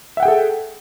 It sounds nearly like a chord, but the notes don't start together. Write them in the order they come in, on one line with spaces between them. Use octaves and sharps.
E5 F#5 G5 G#4 A4